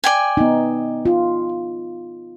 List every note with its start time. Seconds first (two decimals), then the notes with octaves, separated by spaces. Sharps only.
0.04 D5 G5 G#5
0.37 B3 D#4
1.06 F4